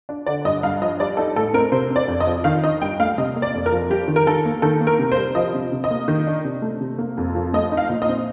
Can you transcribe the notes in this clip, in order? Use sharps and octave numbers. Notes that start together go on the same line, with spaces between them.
D4
D3 D5
G2 D#5
G2 F5
F3 D#5
G3 D5
D#4 A4
A2 A4
C4 A#4
C3 C5
C4
D5
F2
D#5
F3
D#3 F5
D#4 D#5
G2 G5
A3 F5
C3 D#5
A#3
D5
F2
A#4
F3
G3 G4
D#3
A#4
D#3 A4
A#3
D#3 A4
A#3
A#4
C3
C5
G3
F3 D#5
C3
C3
D#5
A#3
D#3
D4
C3
A3
C3
A#3
F2
F3
A3 D#5
D#4
F5
A#2
D#5
C4